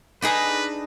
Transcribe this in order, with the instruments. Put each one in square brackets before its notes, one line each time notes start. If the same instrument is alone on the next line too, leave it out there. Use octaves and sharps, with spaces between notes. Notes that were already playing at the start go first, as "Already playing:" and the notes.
[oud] D4 D#4 G#4 [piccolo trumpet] B4